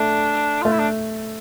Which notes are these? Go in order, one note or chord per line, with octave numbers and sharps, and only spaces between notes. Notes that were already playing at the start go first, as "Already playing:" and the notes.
Already playing: A3 D4
A3 F4
E4
D4